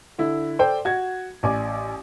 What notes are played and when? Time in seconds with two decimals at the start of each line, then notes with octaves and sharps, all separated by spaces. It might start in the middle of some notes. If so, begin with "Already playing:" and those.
0.18 D3 E4
0.59 A4 C5 D5 G5
0.85 F#4 G#6
1.43 A1 D5 G#5 D6